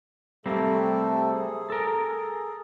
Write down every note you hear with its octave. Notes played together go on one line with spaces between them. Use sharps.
C3 G3 A3 A#3 C4 A4
G#4
A4 A#4